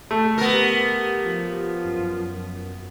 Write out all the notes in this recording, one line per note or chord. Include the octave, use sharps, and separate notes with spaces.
A3
B3 G4 A#4
F3
F#2